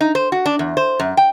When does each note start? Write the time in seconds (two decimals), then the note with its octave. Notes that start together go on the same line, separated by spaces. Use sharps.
0.01 D#4
0.15 C5
0.32 F#4
0.46 D4
0.59 E2
0.77 C5
1.00 F#2
1.17 G5